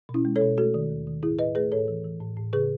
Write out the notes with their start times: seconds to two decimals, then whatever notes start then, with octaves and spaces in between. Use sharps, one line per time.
0.09 B2
0.14 C#4 E4
0.25 G#3
0.36 A4 C#5
0.41 B2
0.57 A3 F#4 A4
0.74 D#3
0.90 D#2
1.07 D#3
1.23 A2 E4 G#4
1.39 A2 B4 D#5
1.55 A3 G#4 B4
1.72 A2 A4 C#5
1.88 E3
2.04 E3
2.20 A2
2.37 A2
2.53 C#3 G#4 B4